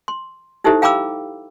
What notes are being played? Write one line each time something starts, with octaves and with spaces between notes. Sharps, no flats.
C6
D#4 E4 G4 A4 C5 E5
F5 G5 A#5 B5 D6 E6